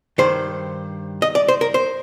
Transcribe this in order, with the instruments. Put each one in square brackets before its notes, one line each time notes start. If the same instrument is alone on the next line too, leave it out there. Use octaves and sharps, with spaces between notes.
[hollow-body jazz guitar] G2 D#3 C5
D#5
D5
C5
A#4
C5